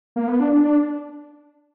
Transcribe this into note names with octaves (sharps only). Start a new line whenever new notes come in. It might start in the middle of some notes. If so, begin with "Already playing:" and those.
A#3
B3
D4
D4
D4